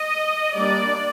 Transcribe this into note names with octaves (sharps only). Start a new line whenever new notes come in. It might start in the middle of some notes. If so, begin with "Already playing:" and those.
Already playing: D#5
G3 A#3 D4 D5